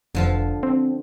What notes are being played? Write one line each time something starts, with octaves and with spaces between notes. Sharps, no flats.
F1 D3 F3 F4
C4